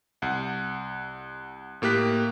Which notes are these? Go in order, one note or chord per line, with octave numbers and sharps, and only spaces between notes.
C2 F#5
A2 A#3 G4 F#6 B6